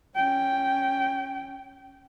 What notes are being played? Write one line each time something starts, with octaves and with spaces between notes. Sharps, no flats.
C#4 G5